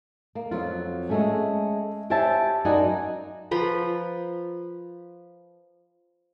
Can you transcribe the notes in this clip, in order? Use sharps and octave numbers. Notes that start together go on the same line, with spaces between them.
A#3
F2 F#3 F4
G#3 A3 C#4
G4 C5 C#5 E5 G#5 A5
F#2 D#4 F#4 D5 F#5 G#5
F3 B4 A#5